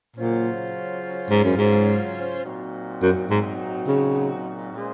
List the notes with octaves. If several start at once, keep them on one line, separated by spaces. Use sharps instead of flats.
A#2 C#3 F#3 C#4 F4 C5
G#2
F#2
G#2
A#2 F#3 C4 D#4 F#4
F#2
G#2
C#3
A#2 G#3 C#4 G#4 C5